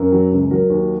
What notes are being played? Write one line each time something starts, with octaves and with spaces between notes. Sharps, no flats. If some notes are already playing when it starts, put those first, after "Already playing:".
Already playing: F#2 A#4
F#3
C#2
F#3 A#4
D#2